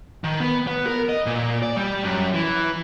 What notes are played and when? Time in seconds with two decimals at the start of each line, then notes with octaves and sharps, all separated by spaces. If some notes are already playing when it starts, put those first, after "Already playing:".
0.24 D#3
0.40 B3
0.67 B3
0.87 A#4
1.09 D#5
1.26 A#2
1.63 D5
1.77 G3
2.03 F#2
2.34 E3